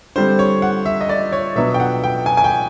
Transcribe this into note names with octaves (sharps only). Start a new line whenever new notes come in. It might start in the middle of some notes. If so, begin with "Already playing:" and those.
D3 G3 C4 C5
C#5
F#5
E5
D#5
D5
C#5
B2 F#3 B3 D4 E5
G5
F#5
G5
G#5
G#5
G5